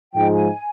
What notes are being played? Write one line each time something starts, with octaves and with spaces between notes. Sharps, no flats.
G#2 F3 G#3 D#4 G5
G#5